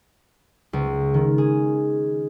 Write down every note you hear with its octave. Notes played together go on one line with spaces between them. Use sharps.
C#2
D#3
G#4